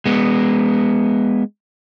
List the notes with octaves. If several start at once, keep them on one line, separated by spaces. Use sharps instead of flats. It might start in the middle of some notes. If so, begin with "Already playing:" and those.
G#3 B3